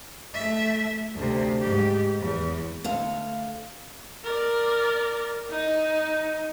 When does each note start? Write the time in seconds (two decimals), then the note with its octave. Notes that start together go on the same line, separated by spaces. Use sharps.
0.34 A3 E5
1.15 D2 C3
1.60 G#2 G4
2.20 E2
2.84 D2 A4 F5
4.24 A#4 D5
5.50 D#4